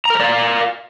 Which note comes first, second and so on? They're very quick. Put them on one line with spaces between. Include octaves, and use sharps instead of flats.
A#5 A#4 C5 D5 F5